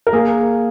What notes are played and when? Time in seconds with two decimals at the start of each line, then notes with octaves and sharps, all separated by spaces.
0.07 A#4
0.13 A#3 G#4